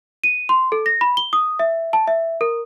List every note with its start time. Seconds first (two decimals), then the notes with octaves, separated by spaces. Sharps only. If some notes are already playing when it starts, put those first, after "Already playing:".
0.24 D#7
0.49 C6
0.72 A4
0.86 A#6
1.01 B5
1.17 G7
1.33 D#6
1.59 E5
1.93 A5
2.08 E5
2.41 A#4